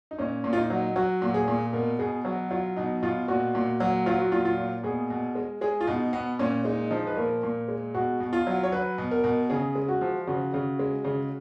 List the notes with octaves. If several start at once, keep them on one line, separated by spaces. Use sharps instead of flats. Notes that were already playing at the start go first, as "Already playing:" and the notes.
D#4
A#2 C#4
A#2
F4
D#4
F#3
F#3 F#4
A#2
G#4
A#2
B2 A#4
B2 G#4
F#3 F#4
F#3 F4
B2 D#4
B2 F4
A#2 F#4
A#2
F#3
F#3 F4
F#4
A#2 F4
F4
A#2
B2 G#4
B2
G#3
G#3 G#4
F4
B2 D#4
B2 B3
A#2 C#4
G#3 D#4
F3 D#4
B4
A#2 A#4
A#2
G#3
B2 F#4
B2
F4
F#3
C#5
F#3 B4
B2
A#4
B2
C#3 G#4
G#3
F#4
F3
C#3 F#4
C#3
G#3
C#3